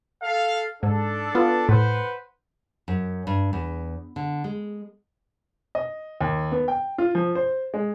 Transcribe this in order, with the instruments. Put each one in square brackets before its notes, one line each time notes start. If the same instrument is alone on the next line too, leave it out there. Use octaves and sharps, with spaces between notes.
[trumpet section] A4 F5
[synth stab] G#2 [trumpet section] D4 A4
[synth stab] B3 F4
[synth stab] A2 [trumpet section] B4 C5 F#5
[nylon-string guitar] F#2
G2
E2
D3
G#3
[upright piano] D#5
D#2
B3
G5
F4
F3
C5
G#3